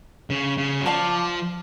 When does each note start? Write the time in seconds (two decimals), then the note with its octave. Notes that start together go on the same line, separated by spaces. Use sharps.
0.30 C#3
0.58 C#3
0.81 F#3
0.86 F3 D5 F5 A5 D6